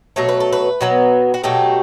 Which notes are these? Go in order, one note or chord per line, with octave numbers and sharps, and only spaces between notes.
B2 F#3 A3 C#5
B4
A4
B4
B2 F#3 B3
F#4
B2 F#3 A3 G4